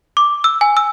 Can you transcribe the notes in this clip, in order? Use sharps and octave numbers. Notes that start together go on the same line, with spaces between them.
D6
E6
G#5
E6